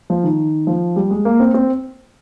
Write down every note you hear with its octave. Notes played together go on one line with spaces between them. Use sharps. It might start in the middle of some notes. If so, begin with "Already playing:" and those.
F3
D#3
F3
G3
G#3
A#3
C4
C4